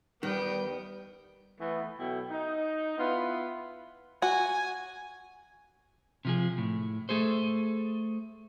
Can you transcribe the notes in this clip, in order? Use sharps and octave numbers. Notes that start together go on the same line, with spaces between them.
E2 D#3 G3 B3 G5
E3 A3 B3
B2 F#3 E4 A4 G5
D#4
B3 E4 F4 B4
F#4 G#5
C3 F3 G#4
A2
A3 G#4 A4 C5